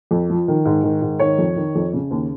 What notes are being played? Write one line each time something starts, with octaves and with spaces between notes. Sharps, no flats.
F2
F3
D#3
G#2
D#3
G#2
D#3 C#5
F2
D#3
F2
C#3
D#2